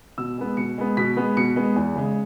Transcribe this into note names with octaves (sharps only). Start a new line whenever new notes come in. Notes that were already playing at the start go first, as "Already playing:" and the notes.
B2 E6
G#3 B3
B2 C#7
G#3 B3
B2 B6
G#3 B3
B2 C#7
G#3 B3
E2
C#3 G#3